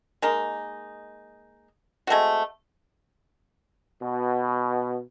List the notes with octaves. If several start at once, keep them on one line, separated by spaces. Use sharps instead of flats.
G#3 A#3 D#4
G#3 A3 C4 F#4
B2